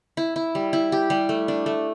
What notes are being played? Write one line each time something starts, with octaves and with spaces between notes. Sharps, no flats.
E4
E4
G3
E4
G4
G3
A3
D4
A3